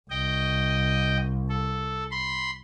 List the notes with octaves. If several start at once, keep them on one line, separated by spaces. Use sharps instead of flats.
C2 D#5 G5
A4
B5 C6